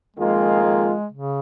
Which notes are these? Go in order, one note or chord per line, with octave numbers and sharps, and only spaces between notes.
F2 D#3 G#3 A#3 F4 G#4
G#3
C#3